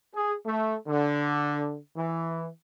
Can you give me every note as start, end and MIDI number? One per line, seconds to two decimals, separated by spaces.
0.15 0.34 68
0.46 0.76 57
0.88 1.78 50
1.96 2.49 52